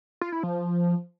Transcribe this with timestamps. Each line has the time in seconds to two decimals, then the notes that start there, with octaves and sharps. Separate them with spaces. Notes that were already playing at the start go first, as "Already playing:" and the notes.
0.21 F4
0.32 E4
0.43 F3